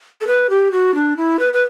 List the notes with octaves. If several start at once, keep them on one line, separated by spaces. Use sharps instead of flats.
A4
B4
G4
F#4
D4
E4
B4
B4